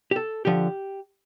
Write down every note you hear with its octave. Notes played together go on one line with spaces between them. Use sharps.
G4
A4
D3 F3 G4